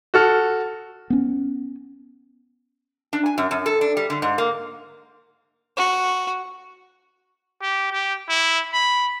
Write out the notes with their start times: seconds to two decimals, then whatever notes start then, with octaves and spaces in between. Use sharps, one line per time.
0.14 F#4 A4 F6
1.10 B3 C#4
3.13 D4
3.26 G#5
3.38 F#2
3.51 F#2
3.66 A4
3.81 D4
3.97 G3
4.10 D3
4.22 G#2
4.38 A#3
5.77 F#4
7.62 G4
7.92 G4
8.28 E4
8.73 B5